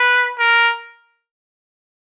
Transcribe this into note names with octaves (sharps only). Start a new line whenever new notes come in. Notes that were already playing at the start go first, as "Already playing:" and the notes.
Already playing: B4
A#4